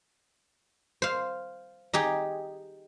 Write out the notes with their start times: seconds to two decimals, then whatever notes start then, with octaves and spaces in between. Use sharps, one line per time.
1.02 C5 F5
1.93 D#4 G4 G#4